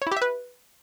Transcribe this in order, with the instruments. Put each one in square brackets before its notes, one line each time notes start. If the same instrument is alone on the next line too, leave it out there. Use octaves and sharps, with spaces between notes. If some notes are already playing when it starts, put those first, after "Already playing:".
[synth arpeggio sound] C#5
E4
G4
E5
B4